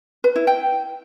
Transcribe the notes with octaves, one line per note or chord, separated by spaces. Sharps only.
B4
E4
G5